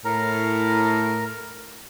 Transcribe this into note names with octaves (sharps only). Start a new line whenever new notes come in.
A2 A#4 A#5